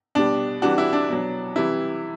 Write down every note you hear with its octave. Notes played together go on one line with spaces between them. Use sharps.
B2 G3 D4
C3 E3 G3 D4 F#4
E4
D4
B2 F#3
C3 E3 G3 E4